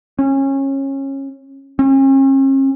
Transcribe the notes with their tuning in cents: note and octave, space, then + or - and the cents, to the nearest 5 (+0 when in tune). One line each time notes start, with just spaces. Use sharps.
C#4 -25
C#4 -45